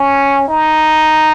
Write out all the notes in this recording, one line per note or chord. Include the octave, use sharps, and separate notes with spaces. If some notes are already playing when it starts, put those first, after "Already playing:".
Already playing: C#4
D#4